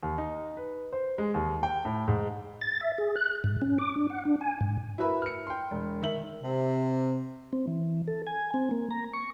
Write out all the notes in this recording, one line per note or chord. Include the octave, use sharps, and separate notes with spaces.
D#2
D#4
B4
C5
G#3
D#2
G5
A2
G#2
A6
E5
G#4
F#6
G#2
C#4
D6
D4
F#5
D4
G#5
G#2
E4 F#4 A#4 B4 E5 B5
F6 C#7
G5 C6
E1
D#3 E5 F#7
C3
C4
E3
A4
G#5
C4
A#3
A#5
C#6